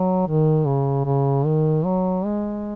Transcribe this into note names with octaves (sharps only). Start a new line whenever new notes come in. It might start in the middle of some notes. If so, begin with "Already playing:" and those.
Already playing: F#3
D#3
C#3
C#3
D#3
F#3
G#3